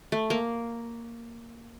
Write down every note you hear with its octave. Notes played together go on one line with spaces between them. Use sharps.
A3
A#3